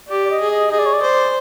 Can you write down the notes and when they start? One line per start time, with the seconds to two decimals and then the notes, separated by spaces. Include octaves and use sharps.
0.09 G4 D5
0.25 D5
0.30 D#5
0.40 G#4
0.50 D#5
0.71 G#4 D#5
0.79 D5
0.86 C#5
0.94 D5
1.02 C5